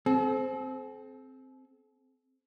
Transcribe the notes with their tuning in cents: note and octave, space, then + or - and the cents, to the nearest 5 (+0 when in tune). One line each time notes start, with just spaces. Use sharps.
C4 +0 A4 -45